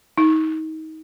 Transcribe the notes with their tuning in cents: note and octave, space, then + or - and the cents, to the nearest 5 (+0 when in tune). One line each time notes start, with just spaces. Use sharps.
D#4 +25